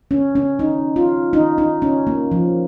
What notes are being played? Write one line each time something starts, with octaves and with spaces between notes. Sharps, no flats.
C#4
C#4
D#4
F4
D#4
D#4
C#4
A#3
F3